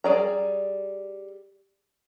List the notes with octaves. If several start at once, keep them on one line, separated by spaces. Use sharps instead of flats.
G3 G#4 D5 A#5